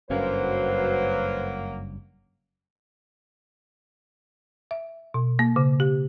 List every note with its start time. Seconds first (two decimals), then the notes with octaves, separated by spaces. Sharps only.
0.10 F#1 G2 F#3 A#3 C#4 B4 C5
4.71 E5
5.14 B2
5.39 A#3
5.56 C#3
5.80 G4